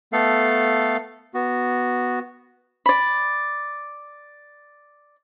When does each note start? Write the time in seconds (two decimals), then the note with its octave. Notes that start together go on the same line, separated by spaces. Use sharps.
0.13 A3 B3 A4 F5
1.34 B3 F#4
2.86 D5 B5